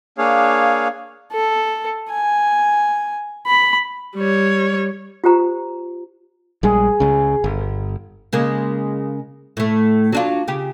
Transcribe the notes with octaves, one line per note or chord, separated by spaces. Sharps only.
A#3 D4 G#4 C#5 F5
A4
G#5
B5
G3 C#5
F4 G4 C5 A#5
A#1 G3 G#3 G#4
C#2 C#3
G1
C#3 G#3 A#3
A2 A3
F#3 D4 F4
C#3 G4